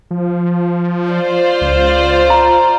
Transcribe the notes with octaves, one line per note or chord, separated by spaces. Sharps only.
F3
F4 C5 D5
C#2
A#5